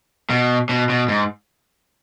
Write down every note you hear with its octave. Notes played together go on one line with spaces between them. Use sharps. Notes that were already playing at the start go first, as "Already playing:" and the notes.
B2
B2
B2
G#2